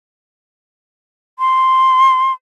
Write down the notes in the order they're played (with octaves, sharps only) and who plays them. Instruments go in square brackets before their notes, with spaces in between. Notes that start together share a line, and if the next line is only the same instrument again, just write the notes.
[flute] C6